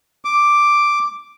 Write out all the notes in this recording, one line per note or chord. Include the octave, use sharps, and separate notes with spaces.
D6